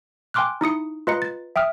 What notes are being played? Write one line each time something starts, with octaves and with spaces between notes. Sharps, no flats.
G5 G#5 C6 D6 F6 F#6
D#4 E4 D#6 C#7
F4 B4 D#5 A#5 C#7
A6
E5 G5 D#6 F6